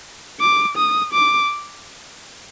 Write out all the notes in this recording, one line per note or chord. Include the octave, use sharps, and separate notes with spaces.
D6
D#6
D6